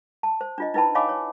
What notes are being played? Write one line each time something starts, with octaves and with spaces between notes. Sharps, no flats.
A5
C5
D4 F4 D#5
D#4 E4 B4 G5 A5 B5
C#5 D#5 F5 G#5 B5 D6
C#5